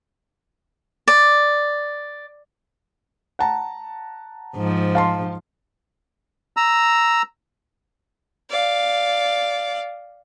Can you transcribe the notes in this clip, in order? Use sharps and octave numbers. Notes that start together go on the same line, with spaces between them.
D5
F#5 A5 A#5
G#2 F3
F5 A5 C6
A#5 E6
D5 F5